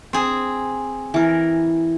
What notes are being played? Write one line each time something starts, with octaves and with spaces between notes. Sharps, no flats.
C4 G#4
E3 A#4